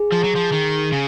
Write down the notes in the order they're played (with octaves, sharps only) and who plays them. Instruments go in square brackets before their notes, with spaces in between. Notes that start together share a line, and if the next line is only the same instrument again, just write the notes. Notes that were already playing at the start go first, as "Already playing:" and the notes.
Already playing: [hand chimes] G#4
[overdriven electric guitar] F3
F#3
F3
D#3
C#3